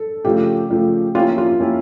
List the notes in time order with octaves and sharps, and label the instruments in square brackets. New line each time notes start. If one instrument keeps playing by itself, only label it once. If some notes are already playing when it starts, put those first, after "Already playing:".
Already playing: [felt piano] A4
[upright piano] C#3 F3 A3 [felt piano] G4
[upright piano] C#3 F3 A3
[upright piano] F3 A#3 C#4 E4 G4 [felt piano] F4
[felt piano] F4
[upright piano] F3 A#3 C#4 E4 G4